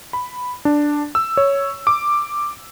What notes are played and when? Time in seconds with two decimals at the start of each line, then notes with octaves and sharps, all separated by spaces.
0.13 B5
0.65 D4
1.15 E6
1.37 C#5
1.87 D6